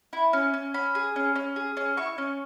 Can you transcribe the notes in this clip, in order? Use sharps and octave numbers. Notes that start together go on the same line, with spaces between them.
E4
C#4
C#4
C#4 B5
G#4
C#4
C#4
G#4
C#4
E4 C#6
C#4